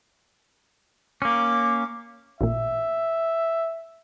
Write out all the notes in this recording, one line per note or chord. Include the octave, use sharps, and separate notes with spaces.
A#3 C#4 D6
A1 A#2 E5